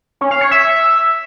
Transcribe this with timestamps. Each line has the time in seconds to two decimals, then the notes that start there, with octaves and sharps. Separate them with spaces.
0.21 C#4
0.31 F5
0.41 C#5
0.51 E5